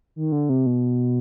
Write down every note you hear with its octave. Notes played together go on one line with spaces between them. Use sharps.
D#3
D3
C3
B2